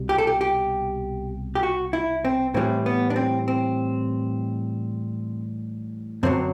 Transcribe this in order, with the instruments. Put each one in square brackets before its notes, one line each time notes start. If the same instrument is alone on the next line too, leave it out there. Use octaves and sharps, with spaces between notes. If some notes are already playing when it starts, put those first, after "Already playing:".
Already playing: [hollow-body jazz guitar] C2 B2 G3
G4
A4
G4
G4
G4
F#4
E4
C4
A2 E3 G3 C4
B3
D4
C4
C4
F#2 D3 F#3 C4